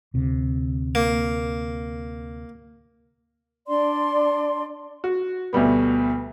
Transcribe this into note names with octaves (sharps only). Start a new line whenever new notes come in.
D2 C3
A#3
D4 D5 C6
F#4
D2 B2 G3 B3